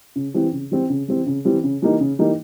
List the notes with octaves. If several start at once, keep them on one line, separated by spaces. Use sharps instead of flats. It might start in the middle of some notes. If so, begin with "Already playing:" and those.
C#3
E3 G3 C4
C#3
E3 G3 C4
C#3
E3 G3 C4
C#3
E3 G3 C4
C#3
E3 G3 A#3 D#4
C#3
E3 G3 A#3 D#4